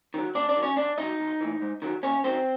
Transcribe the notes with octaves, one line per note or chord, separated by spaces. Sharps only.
D#3 F#3
D#2 D4 D5
D4 D5
D#3 F#3
C#4 C#5
B1 D4 D5
B2 F#3 D#4 D#5
B1
A2 E3
G#2
D#3 F#3
D#2 C#4 C#5
D#3 F#3 C4 C5